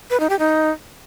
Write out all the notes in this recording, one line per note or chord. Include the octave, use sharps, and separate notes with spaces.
B4
D#4
G4
D#4